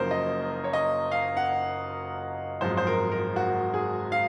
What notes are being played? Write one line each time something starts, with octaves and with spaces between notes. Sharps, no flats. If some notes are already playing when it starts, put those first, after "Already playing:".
Already playing: F#1 F#2 C#3 F3 A#3 A#4 C5
D#5
C#5
D#5
F5
F#5
G#1 F#2 F3 G#3 C5
C5
A#4
A#4
F#4
G#4
F5